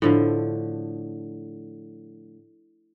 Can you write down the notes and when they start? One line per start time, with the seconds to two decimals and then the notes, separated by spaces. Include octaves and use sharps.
0.02 A2 D3 F3